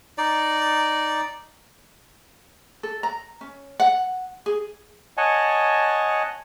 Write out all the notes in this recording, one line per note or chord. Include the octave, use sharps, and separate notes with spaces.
D#4 D5
A4
A#5
C#4
F#5
G#4
C#5 D#5 F#5 G#5 A5